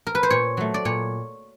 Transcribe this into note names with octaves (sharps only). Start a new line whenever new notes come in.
A#4
B4
C5
A#2 C#5
F#3 A3
D5
A#2 C#5